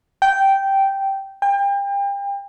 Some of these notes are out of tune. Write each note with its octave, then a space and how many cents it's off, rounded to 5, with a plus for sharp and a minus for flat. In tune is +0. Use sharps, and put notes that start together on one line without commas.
G5 -10
G5 +35